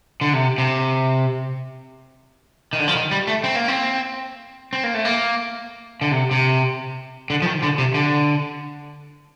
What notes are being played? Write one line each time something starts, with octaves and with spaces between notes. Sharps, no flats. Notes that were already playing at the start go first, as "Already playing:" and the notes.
D3
C3
C3
D#3
D3
F3
D#3
G3
A3
C4
A#3
C4
C4
A#3
A3
A#3
D3
C3
C3
D3
F3
D#3
D3
C3
D3